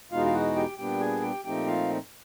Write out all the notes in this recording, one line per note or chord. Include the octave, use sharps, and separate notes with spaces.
E2 B2 G#3 B3 D#4 F4 F5
F5
F#4 F#5
G4 G5
A#2 G3 B3 D4 G4 G5
G#4 G#5
G4 G5
A#2 F3 A3 C4 D#4 G4 G5
F4 F5